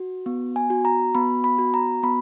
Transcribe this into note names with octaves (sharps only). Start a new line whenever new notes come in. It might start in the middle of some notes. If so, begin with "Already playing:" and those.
Already playing: F#4
B3
G#5
F#4
A#5
B3 B5
B5
F#4
A#5
B3 B5